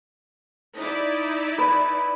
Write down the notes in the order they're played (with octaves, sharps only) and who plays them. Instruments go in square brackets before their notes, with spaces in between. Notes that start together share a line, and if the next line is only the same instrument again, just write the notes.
[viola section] D#4 E4 D5
[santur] B4